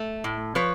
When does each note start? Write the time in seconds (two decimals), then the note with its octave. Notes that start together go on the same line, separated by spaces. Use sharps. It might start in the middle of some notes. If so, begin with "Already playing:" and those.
Already playing: A3
0.24 A2
0.55 F3 B4 C#5